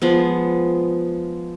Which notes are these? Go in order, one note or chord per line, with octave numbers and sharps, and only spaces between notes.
F3 G#3 B3